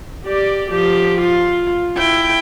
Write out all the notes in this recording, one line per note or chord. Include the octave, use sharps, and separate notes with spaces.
G4 D5
F3 G4
F4
E4 G5